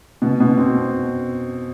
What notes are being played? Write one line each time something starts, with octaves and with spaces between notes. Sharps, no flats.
B2
B2
C4